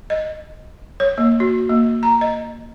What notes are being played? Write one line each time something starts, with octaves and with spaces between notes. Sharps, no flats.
D#5
C#5
A#3
F#4
A#3
A#5
D#5